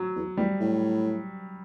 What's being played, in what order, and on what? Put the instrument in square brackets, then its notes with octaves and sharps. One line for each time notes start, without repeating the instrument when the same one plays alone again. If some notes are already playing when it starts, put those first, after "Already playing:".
Already playing: [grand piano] F#3
[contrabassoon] E2
[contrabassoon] E2 [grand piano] G3
[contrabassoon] A2